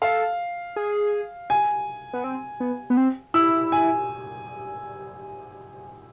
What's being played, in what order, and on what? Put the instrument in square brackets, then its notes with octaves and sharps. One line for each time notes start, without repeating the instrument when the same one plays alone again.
[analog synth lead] A4 [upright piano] F5
[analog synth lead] G#4
[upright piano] G#5
[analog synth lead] B3
C4
B3
B3
C4
[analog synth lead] E4 [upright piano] E6
[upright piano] G#5